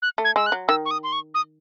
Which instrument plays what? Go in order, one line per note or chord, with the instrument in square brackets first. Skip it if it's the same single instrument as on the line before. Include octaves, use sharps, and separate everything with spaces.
[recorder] F#6
[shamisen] A3
[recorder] G#6
[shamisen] G#3 [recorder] E6
[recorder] F#6
[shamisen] F#3
[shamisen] D#3 [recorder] E6
[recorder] C#6
D#6
C6
C#6
D#6